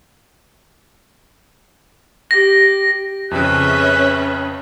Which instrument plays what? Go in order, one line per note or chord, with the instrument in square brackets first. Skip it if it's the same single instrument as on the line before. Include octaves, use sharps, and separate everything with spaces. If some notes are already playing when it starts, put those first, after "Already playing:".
[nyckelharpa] G4 [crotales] A#6
[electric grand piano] F2 C#3 [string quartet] C#4 B4 E5 [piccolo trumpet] F#6